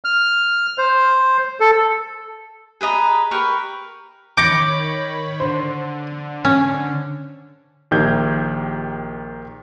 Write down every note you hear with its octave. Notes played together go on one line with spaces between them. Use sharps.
F6
C5
A4
G#4 B4 D#5 A#5
G4 A#4 B4 C#6
D#3 C#5 B5 D6 G6 A#6 C#7
D3 C5
C#4
A#1 D#3 G4 G6 G#6